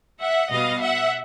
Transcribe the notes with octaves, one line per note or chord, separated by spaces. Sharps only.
E5 F#5
B2 G3 B3 D#5 F5
E5 F#5